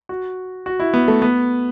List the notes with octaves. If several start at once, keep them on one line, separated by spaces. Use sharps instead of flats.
F#4
F#4
E4
B3
A3
B3